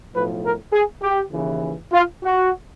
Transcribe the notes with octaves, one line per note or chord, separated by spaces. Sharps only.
B1 A2 F3 B4
A#4
G#4
G4
D#2 C#3 E3
F4
F#4